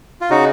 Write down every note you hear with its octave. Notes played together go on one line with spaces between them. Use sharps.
F4
C#3 D#4 F#4